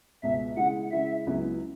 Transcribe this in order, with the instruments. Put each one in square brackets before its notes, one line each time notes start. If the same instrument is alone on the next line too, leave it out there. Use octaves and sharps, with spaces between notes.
[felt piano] C#2 B2 B3 [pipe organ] E5
[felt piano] C#3 G#3 E4 [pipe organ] F#5
[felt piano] C#3 G#3 E4 [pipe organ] E5
[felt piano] C#2 C#3 F#3 B3 E4